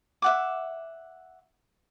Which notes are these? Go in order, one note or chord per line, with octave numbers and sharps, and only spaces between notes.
E5 F#5 D6